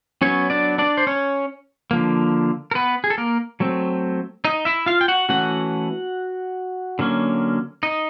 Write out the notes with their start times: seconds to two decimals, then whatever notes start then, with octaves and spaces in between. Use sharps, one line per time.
0.22 F#3 B3 C#4 C#5
0.50 D4 D5
0.78 D4 D5
0.97 C5
1.07 C#4 C#5
1.91 D3 F3 A#3
2.71 A#4
2.75 B3 B4
3.04 G#4
3.10 A4
3.18 A#3 A#4
3.60 F#3 A3 C4
4.45 D#4 D#5
4.65 E4 E5
4.86 F4 F5
5.01 G5
5.08 F#4 F#5
5.29 E3 A3 C#4 F#4 F#5
6.99 D3 F#3 A#3 C#4
7.83 D#4 D#5